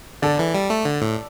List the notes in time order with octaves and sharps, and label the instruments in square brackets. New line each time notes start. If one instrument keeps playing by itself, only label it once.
[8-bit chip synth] D3 [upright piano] A4 D5
[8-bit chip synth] E3
G3
A3
D3
A2